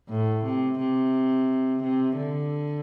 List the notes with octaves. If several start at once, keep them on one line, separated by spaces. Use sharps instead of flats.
A2
C3
C3
C3
D3